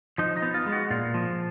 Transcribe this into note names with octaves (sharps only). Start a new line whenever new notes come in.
F3 D#4
D#4
B3
F4
G#3
F#4
A#2 F4
F3